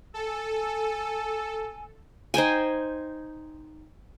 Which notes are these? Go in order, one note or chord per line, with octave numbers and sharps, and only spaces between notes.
A4 G#5 E6
D#4 C5 G5 G#5